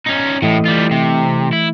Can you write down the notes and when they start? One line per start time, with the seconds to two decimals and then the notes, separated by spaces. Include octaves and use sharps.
0.06 C#4 D#4
0.42 A2 E3 A3 D#5
0.65 G3 F4
0.91 C3
1.53 E4